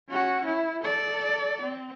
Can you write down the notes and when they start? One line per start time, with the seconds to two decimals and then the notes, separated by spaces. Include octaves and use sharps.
0.10 C#4 F#4
0.45 E4
0.83 A4 D5
1.62 C4